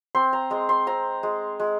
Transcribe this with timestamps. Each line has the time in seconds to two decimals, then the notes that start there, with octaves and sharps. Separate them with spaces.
0.15 C4 C6
0.33 A#5
0.50 G#3 A#5
0.69 C6
0.87 C4 A#5
1.23 G#3
1.60 G#3